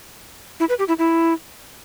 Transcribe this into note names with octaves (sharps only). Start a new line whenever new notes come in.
E4
B4
G4
E4
E4